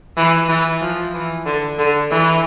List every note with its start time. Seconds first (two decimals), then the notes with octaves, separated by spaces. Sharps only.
0.17 E3
0.49 E3
0.81 F3
1.14 E3
1.46 D3
1.79 D3
2.11 E3